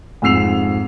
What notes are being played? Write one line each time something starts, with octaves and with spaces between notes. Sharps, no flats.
F2 G#2 E6 C7 F7